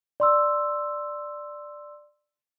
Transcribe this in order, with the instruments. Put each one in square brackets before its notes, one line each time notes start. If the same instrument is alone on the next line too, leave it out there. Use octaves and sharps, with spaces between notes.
[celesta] D5 C6 E6